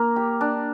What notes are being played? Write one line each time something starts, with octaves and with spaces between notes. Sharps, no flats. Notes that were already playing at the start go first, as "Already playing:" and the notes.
Already playing: A#3 A#4
G4
D4